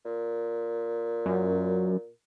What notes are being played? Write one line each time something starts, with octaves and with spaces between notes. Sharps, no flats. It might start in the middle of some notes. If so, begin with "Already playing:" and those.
A#2
F#2